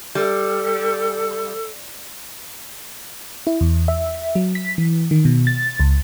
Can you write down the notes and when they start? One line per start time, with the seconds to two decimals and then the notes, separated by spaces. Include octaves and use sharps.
0.15 G3 A4
3.47 E4
3.61 E2
3.88 E5
4.35 F#3
4.55 B6
4.78 E3
5.11 D#3
5.25 B2
5.47 A6
5.80 C#2